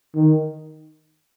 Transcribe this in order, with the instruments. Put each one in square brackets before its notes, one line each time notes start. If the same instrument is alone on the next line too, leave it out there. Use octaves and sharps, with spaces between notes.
[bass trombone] D#3